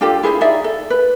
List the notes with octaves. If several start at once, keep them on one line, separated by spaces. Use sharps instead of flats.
D4 F4 G4 A4
E4 G#4 C5 E5
D#4 G#4 D5 E5
A4
B4